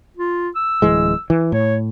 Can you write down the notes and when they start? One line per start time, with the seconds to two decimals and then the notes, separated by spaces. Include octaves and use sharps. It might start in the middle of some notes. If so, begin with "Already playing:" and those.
0.17 F4
0.55 E6
0.82 D1 E3 G#3
1.30 E3
1.52 A2 C#5